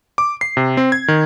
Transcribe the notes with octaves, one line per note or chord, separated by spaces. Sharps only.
D6
C7
C3
C4
G#6
D#3